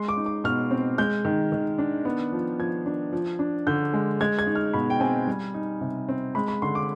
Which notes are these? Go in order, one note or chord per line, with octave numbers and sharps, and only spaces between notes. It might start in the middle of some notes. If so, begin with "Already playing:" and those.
Already playing: G#3 C6
D6
D#4
D6
B2 F6
C4
G#3 G6
D#3
D#3
D4
B3
F3
F3 G#6
D4
F3
D4
D3 G6
G#3
G#3 G#6
G#6
D#4
F6
B2 B5
G5
C4 G#5
G3
D#4
C3
C4
G#3 B5
B5
D3 C6
D6